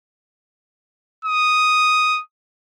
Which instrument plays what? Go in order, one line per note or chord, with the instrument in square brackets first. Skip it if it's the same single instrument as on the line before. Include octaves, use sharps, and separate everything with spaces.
[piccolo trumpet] D#6